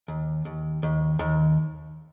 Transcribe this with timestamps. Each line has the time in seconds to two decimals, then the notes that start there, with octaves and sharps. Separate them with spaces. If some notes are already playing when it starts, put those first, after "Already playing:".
0.08 D#2
0.45 D#2
0.83 D#2
1.19 D#2